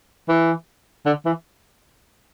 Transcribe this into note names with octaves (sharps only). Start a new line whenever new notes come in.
E3
D3
E3